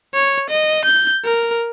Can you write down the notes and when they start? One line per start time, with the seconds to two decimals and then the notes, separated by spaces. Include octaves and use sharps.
0.14 C#5
0.50 D#5
0.85 G6
1.25 A#4